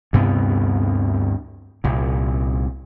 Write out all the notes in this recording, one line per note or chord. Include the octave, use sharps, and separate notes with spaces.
D2 G2 C3 B3
C2 A#2